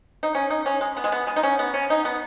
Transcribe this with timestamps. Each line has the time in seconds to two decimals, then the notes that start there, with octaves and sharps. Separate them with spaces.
0.23 D#4
0.35 C#4
0.50 D#4
0.66 C#4
0.81 G#3
0.97 B3
1.04 G#3
1.12 B3
1.27 G#3
1.36 D#4
1.43 C#4
1.59 B3
1.74 C#4
1.90 D#4
2.05 B3